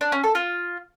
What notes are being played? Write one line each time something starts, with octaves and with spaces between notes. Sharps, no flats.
D4
C#4
A4
F4